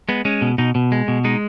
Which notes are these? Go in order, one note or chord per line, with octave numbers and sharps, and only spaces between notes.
G#3 B3
G#3 C#4
B2
B2 D#4
B2
G#3
B2
G#3 D#4